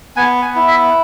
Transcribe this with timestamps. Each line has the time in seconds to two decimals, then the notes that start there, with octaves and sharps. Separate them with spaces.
0.17 B3 G#5
0.42 G#5
0.55 E4
0.68 E5